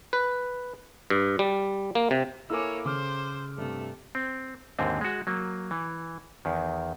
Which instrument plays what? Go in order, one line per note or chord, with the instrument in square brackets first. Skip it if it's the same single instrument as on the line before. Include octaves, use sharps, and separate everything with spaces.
[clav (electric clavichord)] B4
G2
G3
A#3
C3
[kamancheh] A#3 C#5 [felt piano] E4 A4 G#5 [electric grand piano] D6 E6
[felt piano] C#3 [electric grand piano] A4 D6 F6 [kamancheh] C5
[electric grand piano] G2 C3 [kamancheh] A3
[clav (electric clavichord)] C4
D#2 G#2 D3 C4
G#3 F#4
F#3 A#3
E3
E2 D#3